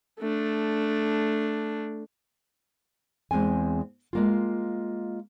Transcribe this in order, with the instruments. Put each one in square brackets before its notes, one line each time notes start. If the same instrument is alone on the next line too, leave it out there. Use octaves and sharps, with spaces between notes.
[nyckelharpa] A3 D4
[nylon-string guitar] E2 G#3 C4 G#5
G#3 A#3 F4